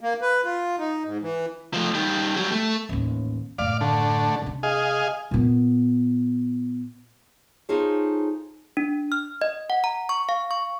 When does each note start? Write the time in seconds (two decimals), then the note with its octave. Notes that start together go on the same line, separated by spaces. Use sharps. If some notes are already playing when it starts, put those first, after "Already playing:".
0.01 A#3
0.22 B4
0.44 F4
0.78 D#4
1.05 G#2
1.22 E3
1.74 F3 A3
1.94 D#3 G3
2.36 F#3 G3
2.52 A3
2.89 A1 D#2
3.58 F#2 A2 D5 F5
3.81 D3 A3
4.42 C3 D4
4.63 G#4 D#5 F5
5.31 A#2 B3
7.69 D#4 F4 G#4 A4 C5 C#5
8.77 D4
9.12 F6
9.42 D#5
9.70 F#5
9.84 A#5
10.09 C#6
10.29 F5
10.51 C#6